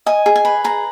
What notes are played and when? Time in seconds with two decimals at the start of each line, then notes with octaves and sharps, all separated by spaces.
0.06 D#5 G#5
0.26 G#4
0.36 G#5
0.45 B4
0.64 G#4 A#5